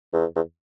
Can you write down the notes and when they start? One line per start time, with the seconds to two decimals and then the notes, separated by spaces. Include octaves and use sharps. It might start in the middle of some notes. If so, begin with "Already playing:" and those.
0.13 E2
0.36 E2